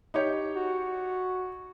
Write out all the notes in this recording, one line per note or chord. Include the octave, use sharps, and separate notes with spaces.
D#4 G4 C#5
F#4